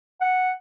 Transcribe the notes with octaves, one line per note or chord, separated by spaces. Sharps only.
F#5